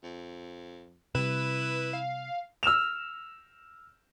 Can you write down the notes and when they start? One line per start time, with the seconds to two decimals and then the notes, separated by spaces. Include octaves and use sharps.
0.03 F2
1.15 C3 G3 E4 B4
1.93 F5
2.63 E6 F6 E7 F7